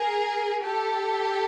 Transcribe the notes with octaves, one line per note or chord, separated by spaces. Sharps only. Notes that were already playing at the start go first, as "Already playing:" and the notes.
Already playing: G#4 A#4
G4 A4